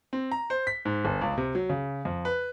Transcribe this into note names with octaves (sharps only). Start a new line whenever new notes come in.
C4
A#5
C5
B6
G#2
G1
C#2
C3
F#3
C#3
F2
B4